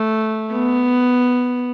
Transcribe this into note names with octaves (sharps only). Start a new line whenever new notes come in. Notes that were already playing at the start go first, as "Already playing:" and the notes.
Already playing: A3
B3